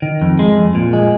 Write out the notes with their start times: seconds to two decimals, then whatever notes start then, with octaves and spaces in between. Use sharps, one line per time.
0.02 D#3
0.22 F2
0.39 G#3
0.57 F2
0.75 A#2
0.93 G#3